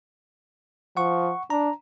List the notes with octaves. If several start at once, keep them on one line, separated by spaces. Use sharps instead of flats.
F3 F#5 C#6
D4 A#5